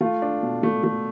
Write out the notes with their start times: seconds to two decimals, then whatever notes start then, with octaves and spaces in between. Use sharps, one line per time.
0.01 A3 F4
0.22 D4
0.43 B2
0.63 A3
0.84 A3